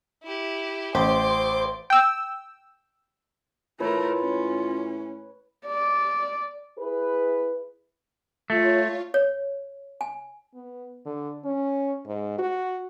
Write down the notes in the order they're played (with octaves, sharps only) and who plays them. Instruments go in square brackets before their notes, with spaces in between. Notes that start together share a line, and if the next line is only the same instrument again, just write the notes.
[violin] E4 G4
[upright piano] A1 [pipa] G4 [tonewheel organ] C5 [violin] C6 D6
[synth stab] G5 E6
[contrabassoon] A2 [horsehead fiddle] A3 A#4 [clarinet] F4 [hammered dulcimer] B4 C#5
[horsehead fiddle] C#4
[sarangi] D5
[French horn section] E4 G#4 B4
[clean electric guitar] A3 [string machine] F4 C#5
[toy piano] C#5
G#5
[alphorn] B3
D3
C#4
G#2
F#4